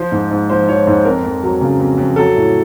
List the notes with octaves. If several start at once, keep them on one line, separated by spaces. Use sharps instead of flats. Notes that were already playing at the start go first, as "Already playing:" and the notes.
Already playing: F3 C5
G#2
G#2
F3 C5
F3 C#5
G#2 C5
F2 A#4
F2
F#3
C#3
F2
F2
F#3 A4
A2